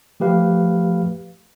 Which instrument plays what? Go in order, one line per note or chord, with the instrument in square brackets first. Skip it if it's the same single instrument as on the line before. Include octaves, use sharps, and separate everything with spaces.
[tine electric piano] F3 A3 G4 B4 F5